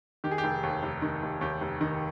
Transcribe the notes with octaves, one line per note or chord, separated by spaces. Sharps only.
D#3 G4
G#4
G4
F1
D#2
F1
D#3
F1
D#2 G4
F1
D#3